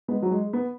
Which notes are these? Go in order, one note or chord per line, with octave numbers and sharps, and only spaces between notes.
G#3 B3
F#3
G#3
B3